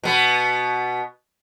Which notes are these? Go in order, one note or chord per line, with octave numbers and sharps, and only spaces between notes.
B2 B3